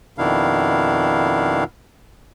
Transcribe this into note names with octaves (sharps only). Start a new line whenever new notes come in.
F2 B2 D#3 D4 E4 F5